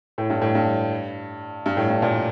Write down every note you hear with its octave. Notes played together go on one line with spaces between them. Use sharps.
A2
G2
A2
G2
G2
A2
G2
A#2